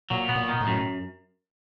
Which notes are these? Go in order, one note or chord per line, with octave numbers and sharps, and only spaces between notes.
A#2 F#3
B3
A#2
D#3
A2
F#2